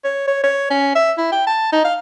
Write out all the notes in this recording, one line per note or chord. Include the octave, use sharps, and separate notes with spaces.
C#5
C#5
C#5
C#4
E5
E4
G5
A5
D#4
F5